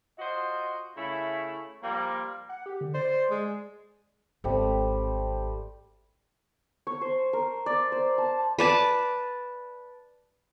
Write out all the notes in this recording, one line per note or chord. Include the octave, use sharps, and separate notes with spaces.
F4 F#4 C5 D#5
C#3 A3 E4
F3 G3 A#3
F#5
G4
D3
C5 D5
G#3
G#1 G3 A3 C4
C#5
C5
A#4
D5
C5
A5
B4 D5 A5